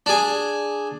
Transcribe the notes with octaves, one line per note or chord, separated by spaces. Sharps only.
D4 G#4